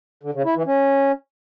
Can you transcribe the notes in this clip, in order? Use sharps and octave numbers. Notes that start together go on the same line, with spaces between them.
D3
C#3
E4
E3
C#4